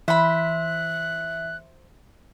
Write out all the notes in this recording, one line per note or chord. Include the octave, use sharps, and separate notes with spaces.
E3 C5 E5 B5 F#6